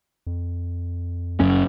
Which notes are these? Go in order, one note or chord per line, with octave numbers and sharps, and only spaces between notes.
F2
F#1 F#2 C#4